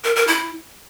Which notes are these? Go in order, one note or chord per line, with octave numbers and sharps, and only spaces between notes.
A#4
A#4
E4